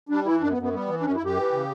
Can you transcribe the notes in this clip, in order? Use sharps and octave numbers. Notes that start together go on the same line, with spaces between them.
G3 D4
E3 E4
F#2 D4
B3
F#2
B3
G3 B3
E3
D4
F#2 C#4
E4
F#2
G4
E3
C#3